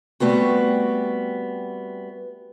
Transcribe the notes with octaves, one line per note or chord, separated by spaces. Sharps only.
G3 A3 B3 C4 F#4